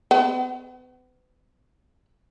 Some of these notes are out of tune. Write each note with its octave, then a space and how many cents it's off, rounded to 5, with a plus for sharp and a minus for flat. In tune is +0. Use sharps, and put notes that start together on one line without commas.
B3 +40 F#5 +40